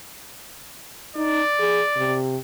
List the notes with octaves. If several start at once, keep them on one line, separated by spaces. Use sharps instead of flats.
D#4 D5
G#4
C3